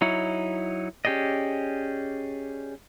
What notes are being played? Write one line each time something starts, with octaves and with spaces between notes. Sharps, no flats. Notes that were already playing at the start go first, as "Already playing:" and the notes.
F#3 D#4 E4 C#5
C#4 G4 G#4 D5 D#5